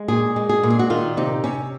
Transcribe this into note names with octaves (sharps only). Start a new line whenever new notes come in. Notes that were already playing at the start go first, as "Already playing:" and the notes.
Already playing: G#3
A#2 G#4
G#3
G#4
A#2
G#4
F#4
D#3 F4
C3 D#4
C3 C#4